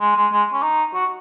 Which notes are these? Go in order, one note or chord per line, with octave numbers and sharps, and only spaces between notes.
G#3
G#3
G#3
C#4
D#4
F#4